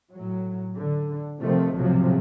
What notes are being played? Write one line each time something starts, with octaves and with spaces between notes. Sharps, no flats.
A2 F#3
D3
C3 D#3 F3 A3 C4
B1 A2 C3 F3 F#3